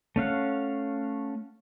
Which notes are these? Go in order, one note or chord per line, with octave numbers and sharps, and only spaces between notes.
A3 C#4 F5 F#5